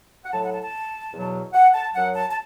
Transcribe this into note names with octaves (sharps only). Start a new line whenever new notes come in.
F#5
A2 F#3 A5
F#5
A5
A5
E2 B2 F#3
F#5
A5
F#2 F#3 F#5
A5
A5